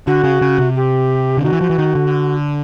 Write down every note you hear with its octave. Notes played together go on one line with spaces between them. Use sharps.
D3 F#4
C#3
C#3
C3
G4
D3
D#3 F#4
E3
F3
E3
D#3
D3